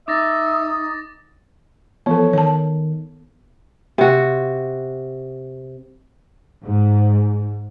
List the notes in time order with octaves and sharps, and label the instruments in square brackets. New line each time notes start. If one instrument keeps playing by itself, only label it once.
[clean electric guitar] D#4 [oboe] E5 [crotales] D6 A6 A#6 [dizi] D#6
[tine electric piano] E3 F3 C#5 [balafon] B3 A4
[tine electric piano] D#3 [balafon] C#5 A5
[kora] C3 F#4
[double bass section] G#2